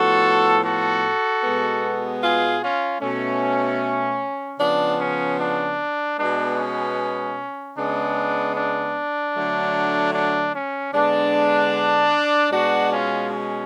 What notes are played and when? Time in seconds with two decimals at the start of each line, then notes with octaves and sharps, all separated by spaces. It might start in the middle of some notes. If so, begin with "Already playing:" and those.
Already playing: A2 F3 B3 F#4 A4
0.63 F#4 A4
1.44 B2 G#3 B3
2.22 F4 G#4
2.62 C#4 F4
3.01 B2 A3 C#4
4.59 C#3 F3 B3 D4
4.99 C#4
5.39 D4
6.18 B2 G#3 B3 D4
6.57 C#4
7.76 C#3 G#3 B3 D4
8.56 D4
9.35 D3 F#3 A3
10.14 D4
10.54 C#4
10.93 D3 G#3 B3 D4
12.52 B2 G#3 B3 D4 F#4
12.91 C#4 F4
13.31 C#4